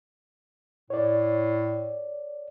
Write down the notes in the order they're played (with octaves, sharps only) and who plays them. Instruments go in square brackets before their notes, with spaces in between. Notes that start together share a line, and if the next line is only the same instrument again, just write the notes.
[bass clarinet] A2 [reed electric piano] C#5 D5